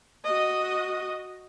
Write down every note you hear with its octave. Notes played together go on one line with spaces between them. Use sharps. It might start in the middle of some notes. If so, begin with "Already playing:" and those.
F#4 D#5